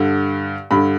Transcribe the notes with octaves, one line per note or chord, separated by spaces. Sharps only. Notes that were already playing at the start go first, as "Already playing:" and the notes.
Already playing: G2 D3
G2 D3 B5